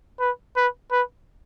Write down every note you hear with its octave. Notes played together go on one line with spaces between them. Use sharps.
B4
B4
B4